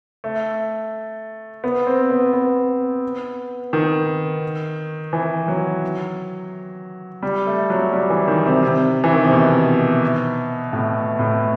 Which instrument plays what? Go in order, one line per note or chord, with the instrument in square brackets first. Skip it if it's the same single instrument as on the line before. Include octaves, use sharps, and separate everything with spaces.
[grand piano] A3
B3
C4
B3
B3
D#3
E3
F#3
G3
A3
F#3
G3
E3
D#3
C3
C3
E3
D#3
C3
B2
A2
A2